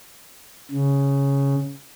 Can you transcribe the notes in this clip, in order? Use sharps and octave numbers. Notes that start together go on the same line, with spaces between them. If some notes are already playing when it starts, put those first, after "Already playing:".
C#3